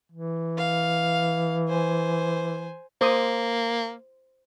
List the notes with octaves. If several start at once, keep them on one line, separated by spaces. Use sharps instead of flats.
E3
F5
C5 G#5
A#3 C5 D6 D#6